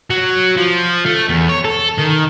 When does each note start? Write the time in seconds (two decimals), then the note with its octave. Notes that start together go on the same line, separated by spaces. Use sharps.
0.10 F#3
0.57 F3
1.06 A3
1.29 E2
1.49 C#5
1.65 A4
1.99 D#3